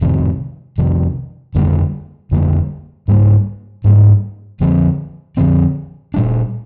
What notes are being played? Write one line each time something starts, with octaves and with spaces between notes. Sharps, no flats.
F2 C3 D#3
F2 C3 D#3
F2 D3 G3 A#3
F2 D3 G3 A#3
G#2 G3 A#3
G#2 G3 A#3
F2 D3 F3 C4
F2 D3 F3 C4
A#2 G3 D4